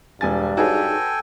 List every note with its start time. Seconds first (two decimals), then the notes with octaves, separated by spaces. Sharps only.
0.21 E1 G2 G#5 A6
0.57 D#4 F#4 G#4 A4 B4 C#5 G5 G#5